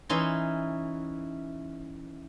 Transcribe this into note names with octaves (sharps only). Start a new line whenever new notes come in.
E3 C#4 D#4 C6